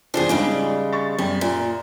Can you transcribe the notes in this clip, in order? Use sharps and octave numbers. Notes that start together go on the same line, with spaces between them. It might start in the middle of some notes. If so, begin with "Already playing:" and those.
E2 F3 G3 D4 G#4
G#2 C#3 G3 G#3 D7
C#6 A6
F#2 G3
A#2